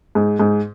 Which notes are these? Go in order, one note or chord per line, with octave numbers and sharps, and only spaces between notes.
G#2
G#2